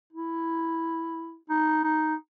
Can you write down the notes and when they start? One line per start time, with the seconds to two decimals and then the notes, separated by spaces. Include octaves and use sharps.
0.13 E4
1.49 D#4
1.83 D#4